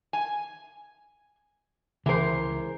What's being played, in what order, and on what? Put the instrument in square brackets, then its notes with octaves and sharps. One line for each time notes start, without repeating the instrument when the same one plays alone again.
[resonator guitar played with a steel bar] G#5
[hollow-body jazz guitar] C#2 A#4 [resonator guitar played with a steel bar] E3 C5